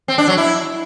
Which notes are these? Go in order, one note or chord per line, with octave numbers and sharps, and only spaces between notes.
C4
D4
F#3
E4